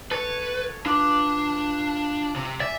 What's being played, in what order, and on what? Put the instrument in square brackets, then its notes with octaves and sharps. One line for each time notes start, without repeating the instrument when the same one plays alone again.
[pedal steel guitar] A4 C#5 [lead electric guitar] B4
[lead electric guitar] D4 [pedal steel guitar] F4 B4 D6
[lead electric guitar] C3
[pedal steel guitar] D5 G#5 [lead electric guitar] E5